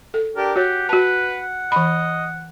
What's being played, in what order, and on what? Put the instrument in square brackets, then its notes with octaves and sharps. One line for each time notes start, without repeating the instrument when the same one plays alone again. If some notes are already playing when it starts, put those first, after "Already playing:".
[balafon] A4
[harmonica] D4 G4 A#4
[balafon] F#4 C#5 [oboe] G4 [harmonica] F#5
[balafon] F#4 A5 [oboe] B4
[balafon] E3 B5 [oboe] D#5